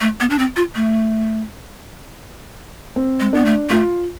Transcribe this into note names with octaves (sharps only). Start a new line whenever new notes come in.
A3
B3
D4
C4
F4
A3
C4
G#3
B3 D4
A3
A3 F4